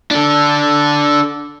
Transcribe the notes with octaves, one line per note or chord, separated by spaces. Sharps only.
D4 A4